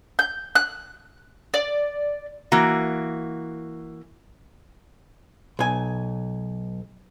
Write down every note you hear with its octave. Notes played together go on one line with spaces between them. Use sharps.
G6
F#6
D5
E3 A#3 F#4
B1 G#5